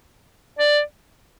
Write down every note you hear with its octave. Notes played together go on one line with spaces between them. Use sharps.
D5